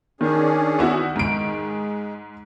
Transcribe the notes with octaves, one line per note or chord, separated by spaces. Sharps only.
D#3 C#4 D4 G#4
B3 E4 F#4
G#2 G#3 D7